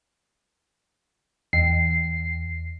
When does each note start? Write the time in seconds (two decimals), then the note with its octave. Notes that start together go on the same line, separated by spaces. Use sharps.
1.53 E2 C7